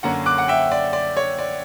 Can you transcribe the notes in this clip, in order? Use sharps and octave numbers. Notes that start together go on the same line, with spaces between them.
F#2 D3 A#3 C#4 F#5 A#5
D6 F#6
F#5
E5 G5
D5
D5
C#5
D5